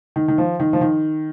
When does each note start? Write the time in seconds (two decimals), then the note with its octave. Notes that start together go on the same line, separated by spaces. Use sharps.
0.16 D#3
0.28 D#3
0.38 F3
0.60 D#3
0.73 F3
0.81 D#3